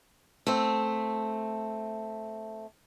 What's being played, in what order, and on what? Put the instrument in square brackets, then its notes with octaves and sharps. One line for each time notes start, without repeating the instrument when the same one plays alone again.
[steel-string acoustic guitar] A3 C4